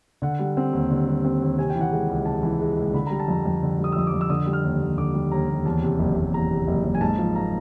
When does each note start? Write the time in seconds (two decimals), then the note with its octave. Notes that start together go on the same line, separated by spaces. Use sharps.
0.22 D3 F#5
0.39 G3
0.57 C4
0.73 D#2
0.91 D3
1.07 G3
1.24 C4
1.42 D#2
1.58 C3 G#5
1.70 G5
1.75 E3
1.81 F#5
1.92 G#3 G5
2.09 C#2
2.26 C3 A5
2.43 E3
2.61 G#3
2.77 C#2
2.93 D3 B5
3.07 G3 A#5
3.20 A5
3.28 F2 A#5
3.46 F2
3.63 D3
3.78 G3
3.84 D#6
3.92 E6
3.96 F2 D#6
4.07 D6
4.13 F2
4.21 E6
4.30 D3 D#6
4.46 G3
4.53 F6
4.64 D#2
4.81 D#2
4.98 D3 D6
5.14 G3
5.32 D#2 A#5
5.49 D#2
5.65 E2 A5
5.83 C3
5.99 F#1
6.16 F#1
6.33 E2 A#5
6.51 C3
6.68 F#1
6.85 F#1
6.95 G#5
7.01 G#2 A5
7.18 F3
7.36 A#3 A#5